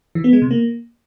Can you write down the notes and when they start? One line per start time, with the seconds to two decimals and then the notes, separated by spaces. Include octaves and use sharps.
0.15 E3
0.24 B3
0.33 G#3
0.42 C3
0.51 A#3